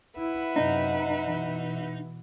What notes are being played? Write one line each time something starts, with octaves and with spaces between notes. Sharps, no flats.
E4 B4 E5 F#5
F#2 C3 D#4
B2 E3